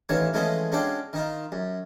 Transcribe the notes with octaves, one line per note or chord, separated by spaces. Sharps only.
A1 D#3 E3 C#5 F5
E3 F3 G#3 A3 C#4 D#5
G#3 C#4 D4 F#4 F5 G5
D#3 D#4 F4
F#2